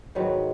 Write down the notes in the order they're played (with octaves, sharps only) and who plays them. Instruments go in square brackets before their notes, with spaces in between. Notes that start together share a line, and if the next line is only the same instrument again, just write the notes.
[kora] G#2 D#3 F#3 B3